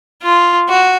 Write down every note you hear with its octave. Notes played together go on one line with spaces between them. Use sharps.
F4
F#4